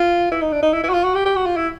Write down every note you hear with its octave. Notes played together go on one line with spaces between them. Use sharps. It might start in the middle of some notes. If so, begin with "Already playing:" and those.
Already playing: F4
E4
D#4
D4
D#4
E4
E4
F#4
F4
F#4
G4
G4
F#4
F4
E4